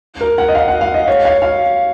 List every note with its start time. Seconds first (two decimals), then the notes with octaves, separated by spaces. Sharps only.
0.21 A#4
0.38 F#5
0.48 D#5
0.55 F5
0.68 F#5
0.81 F5
0.94 D#5
1.08 C#5
1.25 F5
1.42 F5